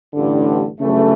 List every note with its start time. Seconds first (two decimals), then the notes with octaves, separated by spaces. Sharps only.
0.14 A1 G2 D3
0.79 G1 F#2 C#3 E3 A3